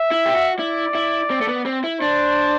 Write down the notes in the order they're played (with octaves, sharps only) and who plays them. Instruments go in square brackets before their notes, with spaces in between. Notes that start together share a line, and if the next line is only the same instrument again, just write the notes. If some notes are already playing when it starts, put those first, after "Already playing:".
Already playing: [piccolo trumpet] E5
[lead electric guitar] E4
G4
F#4
[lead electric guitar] E4 [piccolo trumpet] D5
[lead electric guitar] E4
C4
A3
B3
C4
E4
[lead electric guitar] D4 [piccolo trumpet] C5